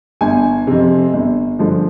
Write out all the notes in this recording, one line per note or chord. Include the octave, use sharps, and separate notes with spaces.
G1 G#5
F2 C3
G1
G2 D3 F3